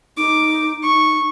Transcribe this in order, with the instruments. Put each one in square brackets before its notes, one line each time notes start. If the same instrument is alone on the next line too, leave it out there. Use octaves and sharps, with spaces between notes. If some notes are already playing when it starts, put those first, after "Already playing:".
[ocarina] D#4 [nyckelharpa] D6
[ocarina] D#4 [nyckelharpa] C#6